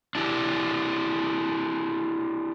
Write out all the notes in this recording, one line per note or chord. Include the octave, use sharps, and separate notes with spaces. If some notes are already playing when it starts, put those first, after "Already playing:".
D4 E4 G4